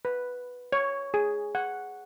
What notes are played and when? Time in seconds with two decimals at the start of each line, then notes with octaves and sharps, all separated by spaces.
0.05 B4
0.72 C#5
1.14 G#4
1.55 F#5